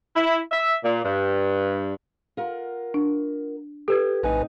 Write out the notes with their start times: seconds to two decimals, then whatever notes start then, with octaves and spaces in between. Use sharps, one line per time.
0.16 E4
0.52 E5
0.84 A#2
1.04 G2
2.37 F4 A#4 F#5
2.94 D4
3.88 G4 A4 B4 G#6
4.23 A#1 A2 C3 D#4 B4 G#5